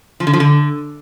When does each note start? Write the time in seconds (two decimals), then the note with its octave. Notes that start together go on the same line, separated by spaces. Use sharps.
0.20 F3
0.27 D3
0.33 F3
0.40 D3